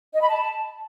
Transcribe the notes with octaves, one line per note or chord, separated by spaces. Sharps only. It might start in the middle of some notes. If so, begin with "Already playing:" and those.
D#5
B5
A5